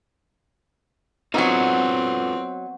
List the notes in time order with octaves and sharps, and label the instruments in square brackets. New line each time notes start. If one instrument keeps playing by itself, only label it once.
[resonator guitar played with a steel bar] F#3 D#4 [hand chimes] B3 F#5 [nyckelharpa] C4 [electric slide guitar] F4 A4 B4